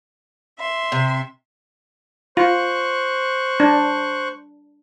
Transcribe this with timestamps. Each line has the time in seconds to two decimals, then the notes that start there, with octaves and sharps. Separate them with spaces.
0.59 E5 C6
0.92 C3
2.37 F4 C5 C#6 F#6
3.60 D4